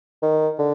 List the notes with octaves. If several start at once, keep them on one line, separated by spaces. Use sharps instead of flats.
D#3
D3